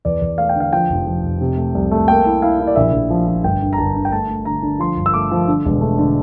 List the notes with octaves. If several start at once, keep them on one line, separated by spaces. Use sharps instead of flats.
E2 D5
E2
A3 F5
G5
D3
F5
F3 G5
F1
F3
F1
C3
A3
C2
A3
A#3 G5
E4
E4 F5
E4
D5
A#1 E5
A#1
F3
F3
G1 G5
D3
A#5
G1 A5
D3
G5
A3 A5
A3
D3 A#5
D3
F3 C6
G1
E6
A3 D6
F3
D3
E1
A3
D3